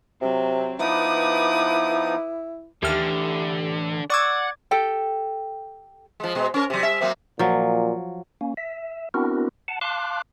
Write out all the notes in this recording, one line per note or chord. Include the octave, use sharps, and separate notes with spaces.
C3 F#3 C4
F3 B3 D#4 E4 B4 D6 D#6
D#2 D3 E3 A3 G4 E5 F6
D5 F#5 C#6 D6 E6 G#6
G4 A4 G5
F3 G#3
B2 G#3
C#4 A#4
C3 F#3
G3 E5
F#3 A#3 C4
A#2 F3 F#3
A#3 C#4
E5
B3 C4 D4 E4 F#4 A#4
F#5 A5
F5 A5 C6 D6 F#6